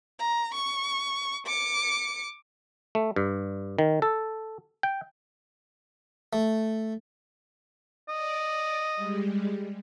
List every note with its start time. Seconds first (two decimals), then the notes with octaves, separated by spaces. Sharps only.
0.19 A#5
0.54 C#6
1.47 D6 C#7
2.95 A3
3.16 G2
3.79 D#3
4.02 A4
4.83 G5
6.33 A3
8.09 D5 D#5
8.96 G3 G#3